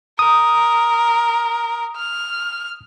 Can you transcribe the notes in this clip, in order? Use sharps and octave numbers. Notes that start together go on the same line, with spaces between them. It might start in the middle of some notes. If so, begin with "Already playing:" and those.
A#4 D#6
F6